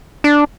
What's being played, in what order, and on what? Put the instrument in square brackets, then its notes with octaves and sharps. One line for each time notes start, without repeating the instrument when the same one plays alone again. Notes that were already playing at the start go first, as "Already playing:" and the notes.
[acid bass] D4